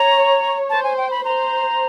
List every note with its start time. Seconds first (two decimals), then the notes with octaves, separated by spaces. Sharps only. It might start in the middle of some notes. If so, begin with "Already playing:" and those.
Already playing: C#5 A#5
0.70 C5 A5
0.84 G#5
0.98 G5
1.11 B5
1.24 C5 A#5